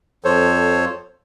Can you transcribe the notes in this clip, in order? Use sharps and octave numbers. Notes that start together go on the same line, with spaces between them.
F2 F3 A4 C5 C#5